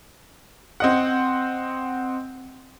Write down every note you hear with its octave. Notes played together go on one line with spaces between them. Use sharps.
C4 D#5 F#5